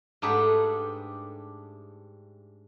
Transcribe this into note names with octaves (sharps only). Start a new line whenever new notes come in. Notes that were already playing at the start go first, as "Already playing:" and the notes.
G#2 A3 D4 G4 G#4 B4